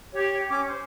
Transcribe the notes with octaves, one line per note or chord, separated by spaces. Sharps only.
G4 C#5
C#4 D6
C5